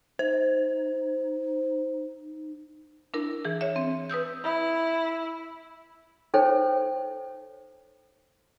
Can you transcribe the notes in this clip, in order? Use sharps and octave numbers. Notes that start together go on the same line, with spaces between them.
D#4 C5
D4 E4 A#4
E3 G#4
C#5 E5
C4
B4 D#6 E6 G6
E4
D#4 A4 C5 C#5 G5